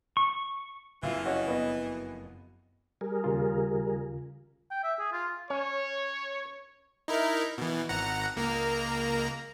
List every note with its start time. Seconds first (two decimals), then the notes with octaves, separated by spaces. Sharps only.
0.17 C#6
1.03 F#1 F2 E3 E4 F4 F5
1.25 C#4 F#4 C#5 D#5 F#5
1.48 B2 B3 D#5
3.01 G3 G#4 A#4
3.24 D#2 C#3 F4
4.71 G5
4.84 E5
4.99 G#4
5.12 F4
5.50 C#4 C#5
7.08 D#4 E4 A#4
7.58 B2 E3
7.89 G#1 F#5 A#5
8.36 C#2 A#3 A#5